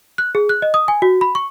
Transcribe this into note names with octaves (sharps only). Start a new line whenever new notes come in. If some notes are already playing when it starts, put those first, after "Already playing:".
F#6
G#4
F#6
D#5
D#6
G#5
F#4
B5
C#6